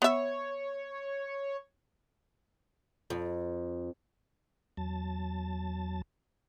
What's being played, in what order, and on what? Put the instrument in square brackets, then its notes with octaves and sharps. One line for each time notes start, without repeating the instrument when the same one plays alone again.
[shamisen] B3 E5 [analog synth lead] C#5
[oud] F2
[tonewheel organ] E2 F#3 A5 A6